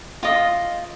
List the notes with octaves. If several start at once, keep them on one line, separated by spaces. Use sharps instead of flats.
F4 D#5